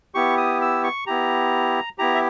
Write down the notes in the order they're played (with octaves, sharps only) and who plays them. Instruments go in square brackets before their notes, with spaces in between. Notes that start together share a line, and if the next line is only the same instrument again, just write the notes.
[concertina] B3 E4 G4 C#6
D#6
E6
C#6
B3 E4 G4 A#5
B3 E4 G4 A#5
E5